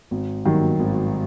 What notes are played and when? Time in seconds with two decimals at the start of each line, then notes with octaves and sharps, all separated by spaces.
0.11 G#1
0.45 G2 D#3 F#3
0.79 G#1